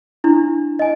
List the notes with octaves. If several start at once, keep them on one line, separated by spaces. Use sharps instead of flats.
D4 E4
D#5 G#5